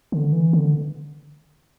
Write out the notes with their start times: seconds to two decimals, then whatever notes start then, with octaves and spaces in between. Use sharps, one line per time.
0.12 D3
0.33 E3
0.53 D3